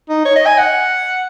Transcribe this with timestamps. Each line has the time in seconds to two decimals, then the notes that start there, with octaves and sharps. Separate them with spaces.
0.09 D#4
0.25 C#5
0.36 D#5
0.46 G#5
0.58 F#5